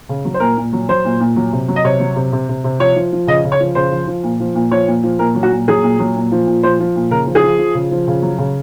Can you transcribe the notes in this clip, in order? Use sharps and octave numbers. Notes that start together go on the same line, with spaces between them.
C#3
F#3
C5
A#2 A#4
A#2
F#3
F#3 C5
A#2
A#2
F#3
C3
F#3
D#5
C3 C#5
F#3
C3
C3
C3
C3
F3 C#5
F3
F3
C#3 D#5
C#3
C#5
F3
C#3 C5
F3
F3
A#2
F3
A#2
F3 C#5
A#2
F3
A#2 A#4
F#3
F#4
A#2
F#3 G#4
A#2
F#3
A#2
F3
A#2
F3 C5
F3
A#2
C#3 A#4
F3
G#4
F3
F3
C#3
F3
C#3
F#3
C#3